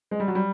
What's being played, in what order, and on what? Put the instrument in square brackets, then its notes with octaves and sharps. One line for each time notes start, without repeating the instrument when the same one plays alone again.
[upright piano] G#3
G3
F#3
G3